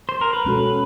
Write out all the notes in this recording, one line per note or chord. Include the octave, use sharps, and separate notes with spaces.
C5
A#4
B4
B2 G#3 C#4 F#4 A4